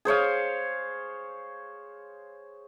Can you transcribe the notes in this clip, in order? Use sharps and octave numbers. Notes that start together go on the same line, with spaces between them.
G#4 C5 C#5 F5